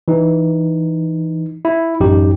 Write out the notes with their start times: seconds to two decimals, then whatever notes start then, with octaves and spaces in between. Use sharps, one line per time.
0.08 E3 D#4
1.65 E4
2.00 A1 F#2 D#4 G4